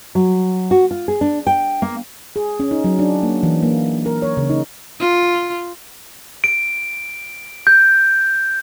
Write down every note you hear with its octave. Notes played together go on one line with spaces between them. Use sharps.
F#3
F#4
F4
G#4
D4
G5
A#3
G#4
C#4
D#4
F#3
D4
A#3
E3
A#3
A#4
C#5
C#3
D#4
F4
D7
G6